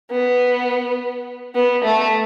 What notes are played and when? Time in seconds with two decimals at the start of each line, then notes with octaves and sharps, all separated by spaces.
0.11 B3
1.56 B3
1.84 A3